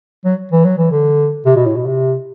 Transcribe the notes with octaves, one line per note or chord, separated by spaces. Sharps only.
F#3
E3
F#3
E3
D3
C3
B2
A2
B2
C3